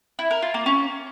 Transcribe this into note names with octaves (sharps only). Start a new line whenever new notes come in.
E4
A#4
F4
A#3
C#4